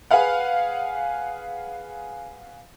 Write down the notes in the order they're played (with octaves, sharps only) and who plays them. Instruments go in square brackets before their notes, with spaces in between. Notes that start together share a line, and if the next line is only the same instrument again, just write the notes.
[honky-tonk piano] G#4 B4 F5 F#5